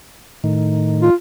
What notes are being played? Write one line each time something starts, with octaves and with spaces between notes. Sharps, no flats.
A2 D#3
F4